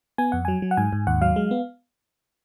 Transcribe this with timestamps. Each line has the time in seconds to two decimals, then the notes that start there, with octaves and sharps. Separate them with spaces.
0.18 B3 G#5
0.32 F2 F#5
0.45 F#3 G#5
0.62 F#3
0.71 F#5
0.77 G#2 G#5
0.93 G#2
1.07 D#2 F#5
1.22 F#3 F5
1.36 G#3
1.51 B3